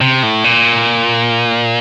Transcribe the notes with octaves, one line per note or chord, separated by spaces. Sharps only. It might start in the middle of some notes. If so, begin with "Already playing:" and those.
C3
A2
A#2